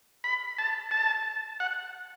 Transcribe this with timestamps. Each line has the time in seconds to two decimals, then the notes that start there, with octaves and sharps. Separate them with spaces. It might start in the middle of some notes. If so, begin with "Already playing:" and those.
0.24 B5
0.58 A5
0.91 A5
1.60 F#5